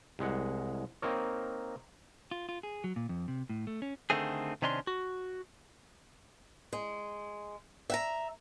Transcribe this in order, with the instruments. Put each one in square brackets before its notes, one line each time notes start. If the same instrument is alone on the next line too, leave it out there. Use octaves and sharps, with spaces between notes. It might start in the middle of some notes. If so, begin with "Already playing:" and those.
[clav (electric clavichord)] C2 G#3 F#5
A#3 C4 D#4 A#4 C#5
[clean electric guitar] F4
F4
G#4
F#3
A#2
F2
C3
A2
A3
C#4
D3 D#3 A3 C4 G#4
C3 D#3 C#4 D4 C6
F#4
[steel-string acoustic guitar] G#3
E5 F#5 A#5